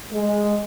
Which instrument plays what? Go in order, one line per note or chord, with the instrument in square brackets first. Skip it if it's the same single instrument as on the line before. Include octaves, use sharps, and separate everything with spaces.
[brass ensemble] G#3